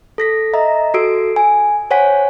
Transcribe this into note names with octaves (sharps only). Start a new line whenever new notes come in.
A4 A#6 B6
D#5 E5 A#5
F#4 A4 E6 D7
G#5
C5 C#5 F#5 G#5 B6